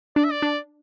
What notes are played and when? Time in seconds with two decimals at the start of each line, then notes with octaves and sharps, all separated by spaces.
0.16 D4 D5
0.24 E5
0.31 D5
0.42 D4